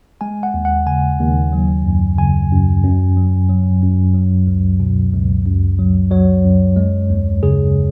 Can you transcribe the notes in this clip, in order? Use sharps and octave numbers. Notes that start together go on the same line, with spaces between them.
G#3 G#5
F#5
D#2
F#5
C#3 G#5
D#2
F#3
F#2
C#3 G#5
F#2
F#2
F#3
F#3
F#2
F#3
C#2
B2
C#2
F#2
F#3
F#3 C#5
F#2
G#3
D#2
C#3 G#4